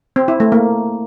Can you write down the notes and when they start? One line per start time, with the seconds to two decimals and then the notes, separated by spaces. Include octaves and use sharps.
0.16 C4
0.28 E4
0.40 A3
0.52 A#3